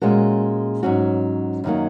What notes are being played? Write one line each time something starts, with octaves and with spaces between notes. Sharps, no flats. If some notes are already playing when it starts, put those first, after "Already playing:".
A#2 G#3 C#4 F#4 A#4
G#2 F#3 C#4 F#4
F#2 D#3 F#3 A#3